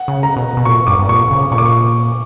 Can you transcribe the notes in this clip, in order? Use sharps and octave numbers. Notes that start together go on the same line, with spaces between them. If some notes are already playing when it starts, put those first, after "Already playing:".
Already playing: F#5
C#3
A#5
B2
B2
A#2 C#6
G2 D6
G2
A#2 C#6
C#3
A#2 C#6
D6
C#6